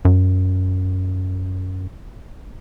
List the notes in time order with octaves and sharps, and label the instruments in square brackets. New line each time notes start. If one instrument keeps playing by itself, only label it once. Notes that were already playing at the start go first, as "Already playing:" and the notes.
[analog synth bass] F#2